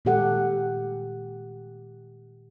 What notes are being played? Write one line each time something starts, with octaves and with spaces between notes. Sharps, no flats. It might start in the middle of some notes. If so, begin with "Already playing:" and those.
A#2 D#3 G#3 G4 A4 F#5